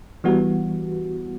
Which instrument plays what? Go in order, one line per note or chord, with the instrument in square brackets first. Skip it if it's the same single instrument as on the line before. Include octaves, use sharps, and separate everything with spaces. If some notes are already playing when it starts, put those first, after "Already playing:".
[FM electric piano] E3 G3 B3 F#4